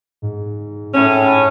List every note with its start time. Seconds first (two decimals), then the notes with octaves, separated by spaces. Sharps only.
0.22 G#2
0.94 A2 C#4